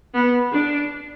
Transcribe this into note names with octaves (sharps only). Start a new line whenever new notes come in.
B3
D4